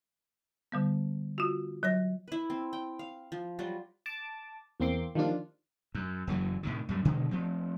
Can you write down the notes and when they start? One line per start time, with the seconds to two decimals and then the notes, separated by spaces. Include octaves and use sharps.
0.72 D3 G3 B3
1.38 F4 F#4
1.83 F#3 C#5 A#6
2.28 E4 B4
2.50 C4
2.73 G5
2.99 F5
3.32 F3
3.59 F#3 G3 F4 F#4
4.06 A5 D6
4.80 E2 A#3 C4 C6 D6
5.15 D#3 F3 G3 A#3 D4 F4
5.95 F#2
6.27 F#1 F#2 E3 F#3
6.63 A2 C3 D#3
6.89 F#2 A2 G3
7.05 B2 D3 D#3 G#3
7.31 F3 A3 C4